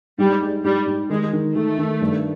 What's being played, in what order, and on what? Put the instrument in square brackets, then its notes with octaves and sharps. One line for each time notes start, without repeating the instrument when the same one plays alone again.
[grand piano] G#2 [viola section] G3
[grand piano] G#3
[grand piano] G#2 [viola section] G3
[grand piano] G#2
[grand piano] D#3 [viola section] G#3
[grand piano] D#3
[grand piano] D#3 [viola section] A3
[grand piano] D#3
G2